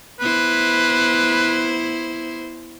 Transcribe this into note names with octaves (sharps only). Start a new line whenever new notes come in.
B3 E4 B4 C5